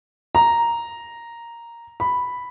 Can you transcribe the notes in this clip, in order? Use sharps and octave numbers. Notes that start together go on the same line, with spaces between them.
A#5
B5